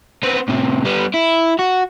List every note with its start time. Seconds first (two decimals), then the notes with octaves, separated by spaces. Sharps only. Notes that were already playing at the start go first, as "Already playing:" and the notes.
0.23 B3 C4
0.48 A2 C3
0.85 G3 B3
1.14 E4
1.59 F#4